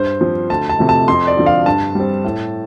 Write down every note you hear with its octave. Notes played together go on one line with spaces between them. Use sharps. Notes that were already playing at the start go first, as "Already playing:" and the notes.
Already playing: G2 C5
F3 C4
D2 A5
A5
C3 F3 A3
A5
F2 C6
D5
D3 F3 C4
F5
G2 A5
G3 C4
A2